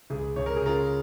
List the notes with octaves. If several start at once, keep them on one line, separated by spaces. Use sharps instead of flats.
C#2 G#4
C#2 C#5
A#4
G#4
C#3 F4 A#4